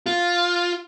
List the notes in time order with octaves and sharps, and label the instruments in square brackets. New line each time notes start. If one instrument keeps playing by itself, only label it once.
[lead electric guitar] F4